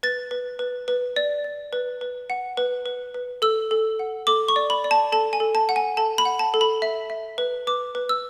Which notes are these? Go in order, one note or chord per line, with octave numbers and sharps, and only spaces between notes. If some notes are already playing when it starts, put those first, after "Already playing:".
B4 A6
B4
B4
B4
D5
D5
B4
B4
F#5
B4
B4
B4
A4 E6
A4
F#5
A4 D6
C#6
D5
B5
D5
A5
A4 A5
G#5
A4
A5
F#5
G#5
A4 A5
B5
F#5
A5
A4
B5
E5
E5
B4
B4 D6
B4
E6